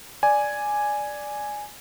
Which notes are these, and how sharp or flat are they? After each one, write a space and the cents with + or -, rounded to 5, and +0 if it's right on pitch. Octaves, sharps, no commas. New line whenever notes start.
D5 +0 G#5 +0